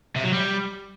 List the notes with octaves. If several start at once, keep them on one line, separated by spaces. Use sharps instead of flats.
C3
F#3
G3